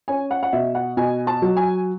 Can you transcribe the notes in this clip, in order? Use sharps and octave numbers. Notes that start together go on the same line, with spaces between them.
C#4 G#5
F#5
F#5
B2 E5
F#5
B2 G#5
A5
F#3
G#5